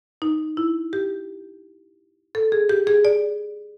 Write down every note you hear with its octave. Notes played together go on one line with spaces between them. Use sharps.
D#4
E4
G4
A4
G#4
G4
G#4
D5